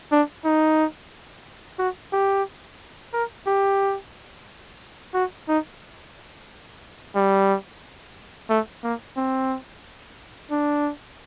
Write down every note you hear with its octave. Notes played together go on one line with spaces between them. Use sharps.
D4
D#4
F#4
G4
A#4
G4
F#4
D#4
G3
A3
A#3
C4
D4